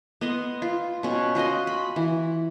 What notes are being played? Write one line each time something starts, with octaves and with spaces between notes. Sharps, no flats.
B3 D#5 C6
F4
B2 C#4
F4 F#4 D#5 C6
B5
E3